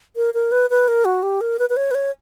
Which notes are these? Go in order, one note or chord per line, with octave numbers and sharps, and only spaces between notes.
A#4
A#4
B4
B4
A#4
F#4
G4
A#4
B4
B4
C#5
B4
C#5